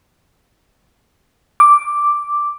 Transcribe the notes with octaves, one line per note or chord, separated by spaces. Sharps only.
D6